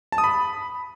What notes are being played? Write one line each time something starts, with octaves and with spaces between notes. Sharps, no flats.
A5
D#6
B5